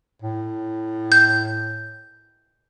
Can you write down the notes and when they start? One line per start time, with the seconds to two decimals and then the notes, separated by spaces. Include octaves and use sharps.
0.22 A2
1.12 G6